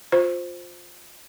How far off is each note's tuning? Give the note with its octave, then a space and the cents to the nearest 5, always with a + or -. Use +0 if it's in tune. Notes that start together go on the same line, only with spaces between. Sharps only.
F4 +20 C5 +0